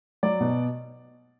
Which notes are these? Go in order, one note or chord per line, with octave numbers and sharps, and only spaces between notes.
F#3 D5
B2